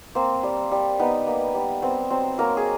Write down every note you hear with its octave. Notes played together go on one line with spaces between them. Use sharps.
A#3 C4 C5
G3
G3
B3 D#4 B4
A#3
G3
B3 C4 C5
F#3 C4 C5
F#3 A#3 A#4
G#4